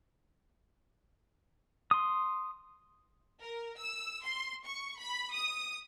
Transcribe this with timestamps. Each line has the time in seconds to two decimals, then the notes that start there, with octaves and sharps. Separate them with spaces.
1.91 C6 D#6
3.39 A#4
3.78 E6
4.23 C6
4.65 C#6
4.99 B5
5.32 D#6